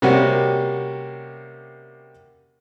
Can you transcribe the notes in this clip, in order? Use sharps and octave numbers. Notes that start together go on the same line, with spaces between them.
C3 G3 A#3 C#4 F#4